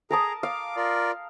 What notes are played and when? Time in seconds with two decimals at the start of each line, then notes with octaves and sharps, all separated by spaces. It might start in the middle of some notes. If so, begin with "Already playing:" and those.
0.10 G#4 A#4 A5 A#5 D#6
0.43 F5 D6
0.76 F4 A#4 D5